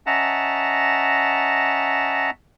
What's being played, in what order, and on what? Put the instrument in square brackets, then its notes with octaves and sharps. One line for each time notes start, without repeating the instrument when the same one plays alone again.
[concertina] C#4 D#5 E5 F#5 A5 A#5